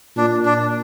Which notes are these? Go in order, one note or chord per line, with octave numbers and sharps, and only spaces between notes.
A#2 D4
D4